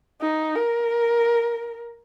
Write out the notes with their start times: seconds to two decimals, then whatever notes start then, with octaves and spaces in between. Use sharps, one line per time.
0.21 D#4
0.55 A#4